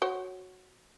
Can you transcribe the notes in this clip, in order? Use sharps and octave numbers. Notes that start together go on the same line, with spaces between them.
F#4 C5 C#5